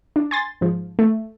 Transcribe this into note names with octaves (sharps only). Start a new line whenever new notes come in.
D4
G#5 C6 A6
G#2 F3
A3